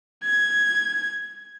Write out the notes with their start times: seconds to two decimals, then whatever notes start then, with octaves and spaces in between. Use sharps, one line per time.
0.24 G#6